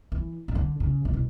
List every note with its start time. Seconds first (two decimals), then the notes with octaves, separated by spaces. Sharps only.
0.12 E3
0.48 C#3
0.55 D3
0.80 C#3
1.05 C3
1.13 B2